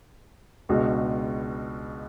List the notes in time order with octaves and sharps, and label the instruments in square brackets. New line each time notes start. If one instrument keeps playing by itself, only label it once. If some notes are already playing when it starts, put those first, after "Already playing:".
[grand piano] C#2 B2 G#3 D4 F#4